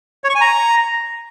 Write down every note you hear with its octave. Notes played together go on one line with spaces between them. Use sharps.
C#5
C#6
G#5
A#5